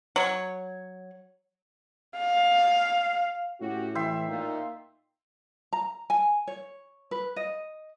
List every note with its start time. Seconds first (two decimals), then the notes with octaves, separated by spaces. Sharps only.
0.16 F#3 C#5
2.17 F5
3.61 A2 C#4 F#4 G4
3.95 E3 E5 G5 C6
4.28 A#2 D#4 F4
5.73 A#5
6.10 G#5
6.47 C#5
7.11 B4
7.36 D#5